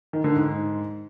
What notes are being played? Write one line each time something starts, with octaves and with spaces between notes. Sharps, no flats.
D#3
D3
G#2